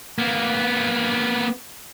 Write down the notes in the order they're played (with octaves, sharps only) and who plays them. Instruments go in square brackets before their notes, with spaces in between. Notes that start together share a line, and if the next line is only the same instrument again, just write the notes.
[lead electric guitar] A#3 B3